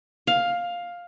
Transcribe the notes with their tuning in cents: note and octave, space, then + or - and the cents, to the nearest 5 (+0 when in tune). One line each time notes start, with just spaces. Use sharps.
F5 +10